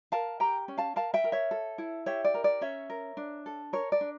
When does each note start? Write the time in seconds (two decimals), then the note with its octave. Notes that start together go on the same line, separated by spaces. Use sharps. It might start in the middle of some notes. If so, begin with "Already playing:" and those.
0.12 A#4 F5 A5
0.40 G4 G5 A#5
0.68 C#4
0.78 F5 A5
0.96 A#4 F5 A5
1.14 E5 G5
1.24 A#4
1.32 C#5 E5
1.51 A4
1.78 E4
2.06 G4 C#5 E5
2.25 D5
2.34 A#4
2.44 D5
2.61 C#4 C#5 E5
2.90 A#4
3.17 D4
3.46 A4
3.73 A#4 C#5
3.92 D5
4.01 D4